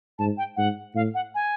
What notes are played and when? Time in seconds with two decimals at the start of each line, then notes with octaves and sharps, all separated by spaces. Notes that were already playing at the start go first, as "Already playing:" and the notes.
0.19 G#2 A5
0.38 G5
0.57 G#2 F#5
0.95 A2 F5
1.14 F#5
1.35 G#5